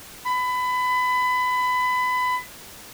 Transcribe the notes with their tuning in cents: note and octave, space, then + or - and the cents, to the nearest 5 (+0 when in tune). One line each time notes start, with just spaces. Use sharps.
B5 +25